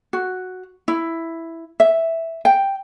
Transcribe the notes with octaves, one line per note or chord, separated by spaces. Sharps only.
F#4
E4
E5
G5